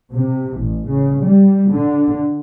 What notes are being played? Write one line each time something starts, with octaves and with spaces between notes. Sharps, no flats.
C3
A1
C#3
G3
D3